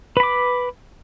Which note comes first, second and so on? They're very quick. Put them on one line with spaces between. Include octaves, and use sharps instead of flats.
B4 B5 D6